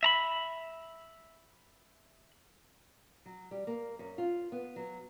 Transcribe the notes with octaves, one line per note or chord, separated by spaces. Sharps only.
E5 A#5 B5
F#3
G3
A#3
F#2
F4
B3
F#3